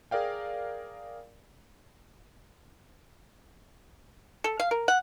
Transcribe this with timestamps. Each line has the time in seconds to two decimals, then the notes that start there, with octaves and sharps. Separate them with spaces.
0.11 G#4 A#4 D5 F5 G5
4.44 A4
4.60 F5
4.71 A#4
4.88 F#5